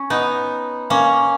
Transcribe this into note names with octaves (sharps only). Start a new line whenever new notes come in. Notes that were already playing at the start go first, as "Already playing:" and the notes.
Already playing: C#4
B3 D#4
A#3 C#4